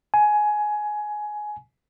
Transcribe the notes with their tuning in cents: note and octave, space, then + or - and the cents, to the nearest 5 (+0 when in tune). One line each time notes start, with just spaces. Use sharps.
G#5 +15